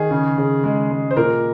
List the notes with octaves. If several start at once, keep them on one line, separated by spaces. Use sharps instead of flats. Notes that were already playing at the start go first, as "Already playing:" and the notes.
Already playing: D#3 G#4
C#3
C#3
G#3
G#3
C5
A#2 A#4